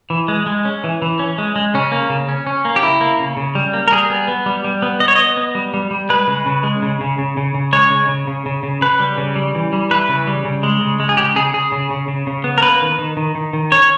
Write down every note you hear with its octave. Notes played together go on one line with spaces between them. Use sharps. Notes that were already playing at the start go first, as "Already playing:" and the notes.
E3
G#3
G#3
C#4
E3
E3
C#4
G#3
G#3
C#3 C#4
A#3
C#3
C#4
C#4
A#3
G4
C#3 E4
A#3
C#3
C#3
G3
A#3
A#4
G3 G#4
B3
B3
G3
G3
B3
B3 D#5
C#5
B3 D#5
B3
G3
G3
G3
G#3 B4
C#3
C#3
G#3
C#3
C#3
C#3
C#3
C#3
G#3 C#5
C#3
C#3
C#3
C#3
C#3
C#3 B4
G3
C#3
G3
E3
G3
E3 B4
C#3
G3
C#3
G#3
C#3
G#3
G#4
C#3 G4
C#3 G#4
C#3 G#4
C#3
C#3
C#3
C#3
B3
A#4
A#3 B4
D#3
D#3
D#3
D#3
D#3
C#4 C#5